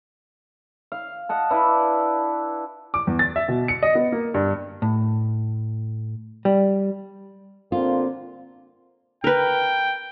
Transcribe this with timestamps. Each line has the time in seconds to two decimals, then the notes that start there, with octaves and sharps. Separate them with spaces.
0.92 F5
1.29 D#5 F#5 A5
1.51 D4 E4 B4
2.94 D6
3.07 E2
3.19 A6
3.36 E5
3.48 B2
3.68 C#7
3.83 D#5
3.95 B3
4.12 A#3
4.34 G2
4.82 A2
6.45 G3
7.72 D3 A#3 C4 F4
9.24 A#4 B4 G5